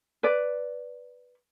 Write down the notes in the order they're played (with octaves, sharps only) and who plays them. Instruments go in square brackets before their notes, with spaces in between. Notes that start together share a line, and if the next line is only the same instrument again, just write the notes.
[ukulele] B4 D5